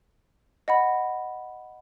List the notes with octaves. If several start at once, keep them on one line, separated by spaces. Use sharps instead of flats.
D#5 F#5 B5